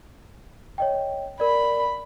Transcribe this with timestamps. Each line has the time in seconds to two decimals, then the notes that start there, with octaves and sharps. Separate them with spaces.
0.78 C#5 D#5 G5
1.40 A#4 D5 B5